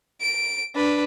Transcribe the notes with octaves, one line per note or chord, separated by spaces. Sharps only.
D7
D4 B4